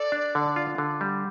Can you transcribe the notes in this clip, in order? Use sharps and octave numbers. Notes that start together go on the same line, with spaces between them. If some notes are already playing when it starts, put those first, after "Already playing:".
Already playing: A4 D5
D4
D3
F4
D3
G3